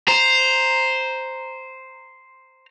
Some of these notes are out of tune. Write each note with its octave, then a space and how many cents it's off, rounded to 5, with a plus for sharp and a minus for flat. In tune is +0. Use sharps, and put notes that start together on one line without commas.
C5 +0 A#5 +0